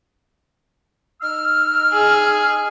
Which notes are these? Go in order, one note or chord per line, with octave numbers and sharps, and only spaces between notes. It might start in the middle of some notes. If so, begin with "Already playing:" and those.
D#4 E6 F6
G#4